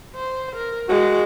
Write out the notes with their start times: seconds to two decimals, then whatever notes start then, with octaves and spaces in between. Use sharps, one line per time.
0.16 C5
0.55 A#4
0.89 G#3 F#4